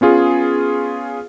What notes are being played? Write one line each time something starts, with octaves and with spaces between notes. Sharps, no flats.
B3 C#4 F4 G#4